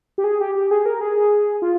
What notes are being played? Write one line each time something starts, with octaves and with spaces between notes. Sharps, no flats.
G4
G#4
G4
G4
G#4
A#4
G#4
F4